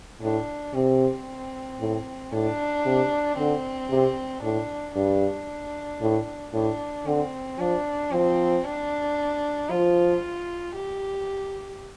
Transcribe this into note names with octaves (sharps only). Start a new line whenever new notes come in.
A2 D4
C3 C4
A2
A2 D4
C3
D3 C4
C3
A2 D4
G2 D4
A2
A2 D4
D3 C4
F3 D4
F3 C4
D4
F3 F4
G4